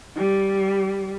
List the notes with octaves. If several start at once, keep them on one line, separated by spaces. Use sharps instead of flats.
G3